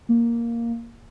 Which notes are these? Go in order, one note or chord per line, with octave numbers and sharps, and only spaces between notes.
A#3